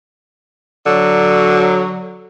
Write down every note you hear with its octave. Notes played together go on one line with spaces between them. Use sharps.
D3 F#3